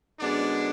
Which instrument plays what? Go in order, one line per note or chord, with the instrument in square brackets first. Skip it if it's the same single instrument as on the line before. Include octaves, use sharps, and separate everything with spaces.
[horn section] F#2 D3 G#3 B3 D4 D5